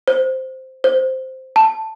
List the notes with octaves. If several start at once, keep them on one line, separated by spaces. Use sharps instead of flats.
C5
C5
A5